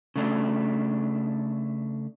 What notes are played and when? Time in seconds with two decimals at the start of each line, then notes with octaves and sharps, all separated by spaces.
0.16 C#3 A3 D4